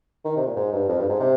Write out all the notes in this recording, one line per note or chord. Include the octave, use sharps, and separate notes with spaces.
D#3
C3
A#2
G#2
G2
F2
G2
G#2
C3